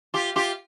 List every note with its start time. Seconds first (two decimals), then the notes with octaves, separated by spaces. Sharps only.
0.14 F4 G4
0.36 F4 G4